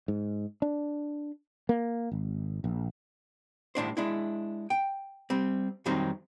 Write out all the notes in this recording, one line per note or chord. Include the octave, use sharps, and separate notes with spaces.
G#2
D4
A#3
G#1
A#1
C2 A2 D4 C5
G#3 D4 E4
G5
G3 C4
F2 D#3 F#3 G3 C4 D#4